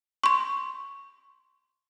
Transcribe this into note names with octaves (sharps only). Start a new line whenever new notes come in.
C6 C#6